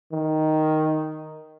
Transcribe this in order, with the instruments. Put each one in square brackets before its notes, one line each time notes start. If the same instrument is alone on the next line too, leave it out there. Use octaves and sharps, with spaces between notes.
[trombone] D#3